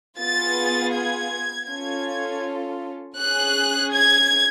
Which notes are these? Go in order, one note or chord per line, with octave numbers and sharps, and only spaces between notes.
B3 F4 G#4 A6
G#6
C#4 F4 A4 G#6
C#4 G#4 F#6
G#6